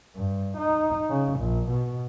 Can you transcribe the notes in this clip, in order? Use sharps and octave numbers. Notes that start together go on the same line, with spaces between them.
G2
D#4
C#3
A#1
B2